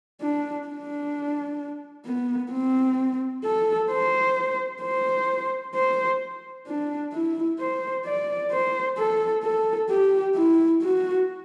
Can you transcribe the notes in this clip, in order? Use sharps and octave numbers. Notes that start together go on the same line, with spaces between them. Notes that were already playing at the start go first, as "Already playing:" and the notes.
D4
D4
B3
C4
A4
C5
C5
C5
D4
E4
C5
D5
C5
A4
A4
G4
E4
F#4